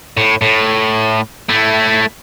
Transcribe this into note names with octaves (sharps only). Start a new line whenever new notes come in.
A2
A2
A3 E4